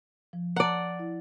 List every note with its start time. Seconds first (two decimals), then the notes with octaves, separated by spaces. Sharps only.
0.33 F3
0.56 D5 F#5 A5 A#5
0.99 E4